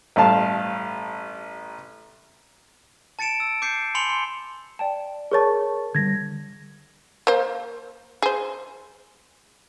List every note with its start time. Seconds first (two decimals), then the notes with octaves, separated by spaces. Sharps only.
0.16 A1 G2 F5 A5
3.19 A5 A6 C#7 D7 E7
3.40 E6
3.62 D6 G6 C7 C#7
3.95 G#5 B5 C6 C#7 F7 G7
4.09 C6
4.79 D5 G5 A5
5.31 G#4 A#4 C#5 A5 C#6 A6
5.95 D3 F3 G3 G#6 A#6
7.27 A#3 C5
8.22 G#4 C5